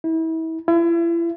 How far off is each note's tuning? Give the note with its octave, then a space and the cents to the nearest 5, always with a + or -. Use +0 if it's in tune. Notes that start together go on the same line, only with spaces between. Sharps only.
E4 -35
E4 +35